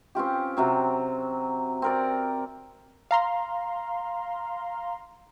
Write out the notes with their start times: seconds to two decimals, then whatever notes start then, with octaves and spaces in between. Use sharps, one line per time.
0.15 C4 C#4 F4 G4
0.57 C3 F#3 C4
1.82 C4 A#4 D5
3.11 F5 A#5 C6